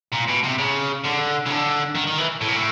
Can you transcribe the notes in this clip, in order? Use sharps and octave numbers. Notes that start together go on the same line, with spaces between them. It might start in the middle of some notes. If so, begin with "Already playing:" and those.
A#2
B2
C3
C#3
D3
C#3
D3
D#3
D#3
E3
A2
A#2
A2